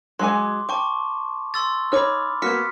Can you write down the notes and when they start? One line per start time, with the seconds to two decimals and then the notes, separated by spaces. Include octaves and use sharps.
0.19 F#3 G#3 G#5 C6 D6
0.69 G5 A5 C#6 D6
1.54 C6 E6 A6
1.92 D#4 C#5 B5 D6 F6
2.42 A#3 B3 F#4 F6 B6 C#7